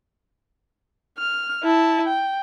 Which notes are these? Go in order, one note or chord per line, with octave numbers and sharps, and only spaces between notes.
F6
E4 A5
G5